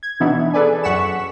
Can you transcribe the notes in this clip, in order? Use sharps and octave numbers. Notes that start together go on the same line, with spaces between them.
G#6
B2 E3 B3 D4 D#4
G#4 A4 B4 D5 G#5
F#2 F#5 C#6 B6 C#7 E7